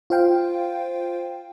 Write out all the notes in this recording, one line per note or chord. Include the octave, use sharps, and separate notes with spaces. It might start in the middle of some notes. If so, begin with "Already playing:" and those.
F4 C5 F5 G5